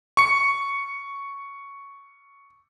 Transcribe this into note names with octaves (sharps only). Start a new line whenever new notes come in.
C#6 C#7